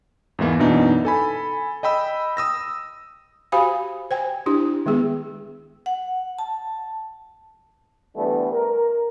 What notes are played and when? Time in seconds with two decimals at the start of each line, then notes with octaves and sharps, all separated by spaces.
0.39 E2 G#2 E3 A#3
0.59 F#2 B2 E3 D4 D#4
1.05 A4 G#5 B5
1.83 D#5 G5 B5 E6
2.37 D#6 E6 A#6
3.52 F#4 G4 C5 F5 G#5 B5
4.11 C5 G5 G#5
4.46 D4 E4 G4
4.86 D#3 G#3 B3 G#4
5.86 F#5
6.39 A5
8.16 D3 E3 G3 A3 B3
8.52 A#4